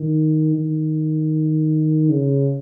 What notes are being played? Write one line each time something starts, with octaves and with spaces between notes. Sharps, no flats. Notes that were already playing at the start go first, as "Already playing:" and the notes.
Already playing: D#3
D#3
C#3